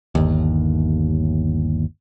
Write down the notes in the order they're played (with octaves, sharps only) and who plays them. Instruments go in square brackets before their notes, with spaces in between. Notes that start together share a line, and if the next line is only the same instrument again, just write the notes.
[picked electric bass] G1 D#2